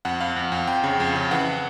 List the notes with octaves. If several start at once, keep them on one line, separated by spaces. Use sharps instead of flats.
F2 F#5
F2 F5
F2
F2
F2 G5
C#3
F2
C#3
E3 F#5